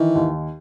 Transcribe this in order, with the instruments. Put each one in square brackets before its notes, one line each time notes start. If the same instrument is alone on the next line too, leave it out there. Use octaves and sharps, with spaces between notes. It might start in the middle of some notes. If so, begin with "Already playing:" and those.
Already playing: [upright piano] D#3 [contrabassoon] E3
[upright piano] D#2